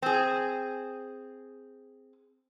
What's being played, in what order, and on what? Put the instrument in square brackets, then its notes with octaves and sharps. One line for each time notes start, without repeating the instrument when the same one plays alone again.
[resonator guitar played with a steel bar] C4 G#4